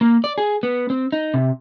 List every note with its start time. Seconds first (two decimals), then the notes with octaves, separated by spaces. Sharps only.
0.01 A#3
0.24 D5
0.38 G#4
0.63 B3
0.90 C4
1.12 D#4
1.34 C3